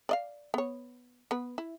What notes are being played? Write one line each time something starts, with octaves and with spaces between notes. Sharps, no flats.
D5 D#5 F5
B3 C#5
B3 B4
E4